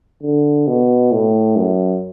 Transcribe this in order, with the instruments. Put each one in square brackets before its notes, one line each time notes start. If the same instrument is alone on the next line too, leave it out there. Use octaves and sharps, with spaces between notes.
[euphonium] D3
B2
A2
F#2